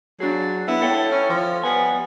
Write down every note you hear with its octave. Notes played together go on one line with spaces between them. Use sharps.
F#3 D4 G#4
B3 E4
A4 C#5 G5
C#4
F3
G3 B3 G#5